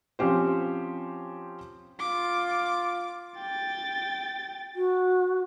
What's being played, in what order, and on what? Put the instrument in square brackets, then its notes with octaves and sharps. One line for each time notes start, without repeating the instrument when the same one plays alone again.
[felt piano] F3 C4 C#4 G4 C5
[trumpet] F4 [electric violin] D6
[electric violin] G5 A6
[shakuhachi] F#4